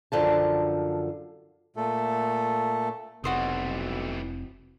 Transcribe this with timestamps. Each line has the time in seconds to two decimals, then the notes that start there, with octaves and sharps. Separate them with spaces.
0.12 F#2 D3 F3 A5
1.76 A#2 A3 A4
3.24 F1 B1 C3 E3 G3 F#4 C5 D#5